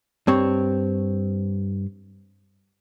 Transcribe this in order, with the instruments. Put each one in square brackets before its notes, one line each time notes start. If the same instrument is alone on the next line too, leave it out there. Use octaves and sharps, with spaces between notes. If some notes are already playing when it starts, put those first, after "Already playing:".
[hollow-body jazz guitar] G2 C4 C#5